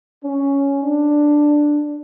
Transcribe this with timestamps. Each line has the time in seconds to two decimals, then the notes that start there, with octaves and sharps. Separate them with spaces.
0.22 C#4
0.82 D4